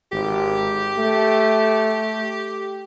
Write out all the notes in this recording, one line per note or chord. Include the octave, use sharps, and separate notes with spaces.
G#1 G4
A3